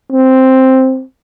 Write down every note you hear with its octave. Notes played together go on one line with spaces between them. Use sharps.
C4